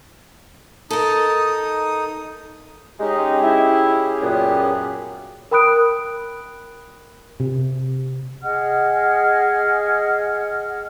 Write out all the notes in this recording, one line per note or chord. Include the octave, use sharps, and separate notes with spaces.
D#4 A4 A#4 D#6
G#3 C#4 D#4 G4 G#4
E4
F#2 A#2 B3
A#4 G5 B5 D#6 F#6 D7
C3
G#4 D#5 F#5 F6